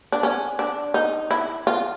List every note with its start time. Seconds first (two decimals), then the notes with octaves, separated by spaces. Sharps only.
0.12 D4
0.23 C#4
0.59 D4
0.94 D#4
1.31 E4
1.67 F4